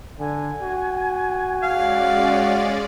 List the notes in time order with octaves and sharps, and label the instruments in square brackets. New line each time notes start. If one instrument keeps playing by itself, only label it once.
[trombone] D3 [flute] G#5
[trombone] F#4
[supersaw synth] G#3 C#4 D5 [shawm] F5